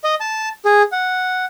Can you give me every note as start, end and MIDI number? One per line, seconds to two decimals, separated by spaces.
0.04 0.15 75
0.20 0.49 81
0.65 0.82 68
0.92 1.45 78